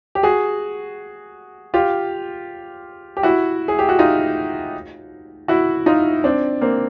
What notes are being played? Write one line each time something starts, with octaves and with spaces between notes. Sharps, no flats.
G4
F#4 G#4
F4 G4
G4
E4 F#4
G#4
G4
F#4
D#4 F4
E4 F#4
D#4 F4
C4 D4
A#3 C4